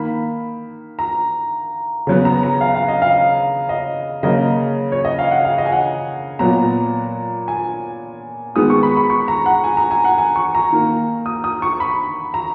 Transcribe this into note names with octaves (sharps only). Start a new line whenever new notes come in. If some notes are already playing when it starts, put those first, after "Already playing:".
Already playing: D#3 A#3 B5
A#5
C#3 F#3 B3
A#5
A#5
F5
F5
D#5
F5
D#5
C#3 F#3 A#3 D#5
C#5
D#5
F5
F#5
F5
D#5
G#5
F#5
A#2 F#3 B3 A#5
G#5
D#3 G#3 B3 D#6
C#6
B5
B5
C#6
A#5
F#5
G#5
A#5
G#5
F#5
G#5
C#6
A#5
D#3 A#3
D#6
D#6
C#6
B5
A#5